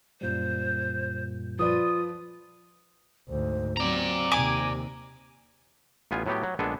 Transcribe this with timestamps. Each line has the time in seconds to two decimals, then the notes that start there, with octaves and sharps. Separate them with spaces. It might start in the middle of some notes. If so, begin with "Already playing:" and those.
0.21 F#2 A#2 G3 C5
1.59 F3 F4 B4 D5 D#6
3.29 D2 G#2 C5
3.77 F#3 C4 D5 A#5
4.32 D#2 C3 G#5 D6
6.11 A1 B3 F4 G#5
6.26 A2 F#3 B3 G4
6.43 F#3
6.59 A#1 G#3 B3 D4 A4 G#5